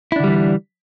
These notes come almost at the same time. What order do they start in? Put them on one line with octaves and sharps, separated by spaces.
E4 D4 D3 G3 E3